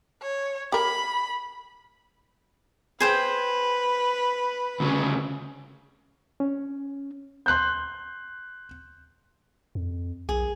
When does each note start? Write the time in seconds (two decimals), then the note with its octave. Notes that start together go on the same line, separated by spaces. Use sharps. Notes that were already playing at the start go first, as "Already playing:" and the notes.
0.22 C#5
0.72 G4 A#4 B5
3.00 G#4 B4 C5 G5
4.80 D2 C#3
6.40 C#4
7.46 C6 F#6 G6
9.75 F2
10.29 B1 G#4